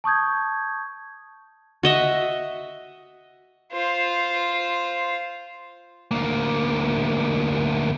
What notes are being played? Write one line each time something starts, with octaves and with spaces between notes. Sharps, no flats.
A5 C#6 D#6 G6 G#6
F#4 D#5 E5
F4 C5
D2 A#3